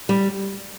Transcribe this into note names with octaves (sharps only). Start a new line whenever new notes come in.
G3